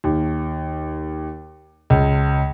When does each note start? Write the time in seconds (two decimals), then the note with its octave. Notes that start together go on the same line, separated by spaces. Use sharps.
0.04 D#2
1.90 C#2